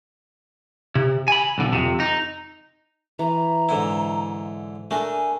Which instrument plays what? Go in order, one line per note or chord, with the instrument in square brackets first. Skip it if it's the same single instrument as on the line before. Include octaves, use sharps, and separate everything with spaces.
[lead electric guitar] C3
G#5 B5
B1 D3
F2 C3
D#4
[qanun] E3 [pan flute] A#5
[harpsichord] G#2 D3 E4
[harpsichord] A3 [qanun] D4 A#4 [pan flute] G#5